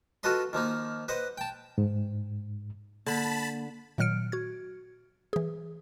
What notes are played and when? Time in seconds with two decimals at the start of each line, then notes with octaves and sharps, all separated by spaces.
0.23 F4 F#4 A4 B4 D#5 C6
0.53 D#3 F3 A#3 D#4
1.08 B4 C5 D#5 F#5
1.38 G5 A5
1.78 G#2
3.06 D3 A#3 A5 B5
3.98 A#2 D#3 F#3 F6 C#7 D7
4.32 F#4 G#6
5.33 E3 G#4